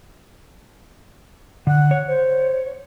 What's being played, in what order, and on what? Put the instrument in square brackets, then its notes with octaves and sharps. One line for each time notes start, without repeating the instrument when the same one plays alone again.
[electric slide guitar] D3 [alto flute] F#5
[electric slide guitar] C#5
[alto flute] C5